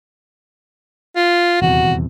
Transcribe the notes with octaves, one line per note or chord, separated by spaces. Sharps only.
F4
D#1 E2 C3 F#4